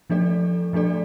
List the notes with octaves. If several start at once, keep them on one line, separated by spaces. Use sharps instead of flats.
F3 A3 D4 A4 D5
F3 A3 D4 A4 D5